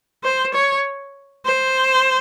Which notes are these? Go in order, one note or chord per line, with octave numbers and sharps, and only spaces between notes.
C5
C#5
C5